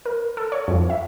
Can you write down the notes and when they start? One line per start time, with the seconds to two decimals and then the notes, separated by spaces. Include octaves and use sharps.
0.05 A#4
0.37 A4
0.52 C#5
0.68 F2
0.90 E5